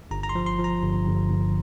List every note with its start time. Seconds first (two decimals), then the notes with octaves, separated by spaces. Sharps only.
0.11 G1 A#5
0.23 A#5
0.29 C6
0.35 F3
0.46 C6
0.59 F3
0.64 A#5
0.82 G1
1.06 G1
1.29 G1